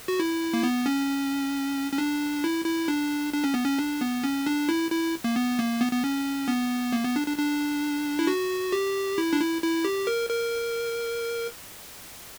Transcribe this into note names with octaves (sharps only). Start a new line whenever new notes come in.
F#4
E4
A#3
B3
C#4
C#4
D4
E4
E4
D4
D4
C#4
B3
C#4
D4
B3
C#4
D4
E4
E4
A#3
B3
A#3
B3
B3
C#4
B3
A#3
B3
D4
D4
D4
E4
F#4
G4
E4
D4
E4
E4
G4
A#4
A#4